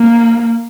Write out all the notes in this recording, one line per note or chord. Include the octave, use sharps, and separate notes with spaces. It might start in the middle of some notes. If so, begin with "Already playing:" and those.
Already playing: A#3